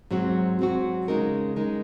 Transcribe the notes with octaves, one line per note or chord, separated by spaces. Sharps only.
G#2 F#3 C4 F#4
G#2 F#3 C4 F#4
C#3 G#3 D#4 A#4
C#3 G#3 D#4 A#4